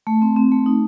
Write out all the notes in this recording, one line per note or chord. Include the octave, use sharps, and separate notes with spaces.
A3
C4
C4
A3
D#4